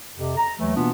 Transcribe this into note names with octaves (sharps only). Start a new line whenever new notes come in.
F2 C3
A#5
D#2 E3 F#3 A3
B2 E3 A#3 B3 D4 F4